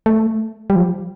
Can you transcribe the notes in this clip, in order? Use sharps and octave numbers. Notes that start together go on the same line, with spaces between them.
A3
G3
F3